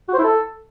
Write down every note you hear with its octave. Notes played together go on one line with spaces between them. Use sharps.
F#4
C5
E4
A4